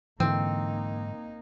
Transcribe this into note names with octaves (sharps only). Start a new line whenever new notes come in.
G#2 D3 E3 A#3 C4 D#4